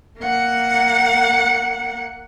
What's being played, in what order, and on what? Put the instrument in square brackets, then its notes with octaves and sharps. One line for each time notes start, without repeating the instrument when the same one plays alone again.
[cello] A#3 F#5